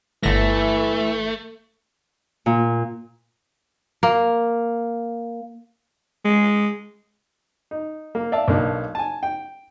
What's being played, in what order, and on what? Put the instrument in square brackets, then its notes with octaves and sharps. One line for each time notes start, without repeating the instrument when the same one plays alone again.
[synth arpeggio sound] G1 A#6 [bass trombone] E3 [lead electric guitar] A3
[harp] A#2
[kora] A#3
[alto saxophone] G#3
[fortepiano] D#4
A#3
D5 E5 F5 A5
B1 A#3 D4 D#4
G#5 A5
G5